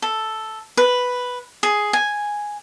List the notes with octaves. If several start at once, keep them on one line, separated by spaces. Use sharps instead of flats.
A4
B4
G#4
G#5